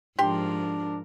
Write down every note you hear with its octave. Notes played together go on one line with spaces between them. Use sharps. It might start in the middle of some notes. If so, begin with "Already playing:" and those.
G#2 F3 D4 G4 A#4 C6